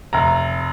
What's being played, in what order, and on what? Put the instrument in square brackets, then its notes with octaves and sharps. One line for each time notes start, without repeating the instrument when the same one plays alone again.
[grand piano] F1 A#5